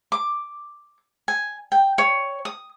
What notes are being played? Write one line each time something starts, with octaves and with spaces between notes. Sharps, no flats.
D6
G#5
G5
C#5
D#6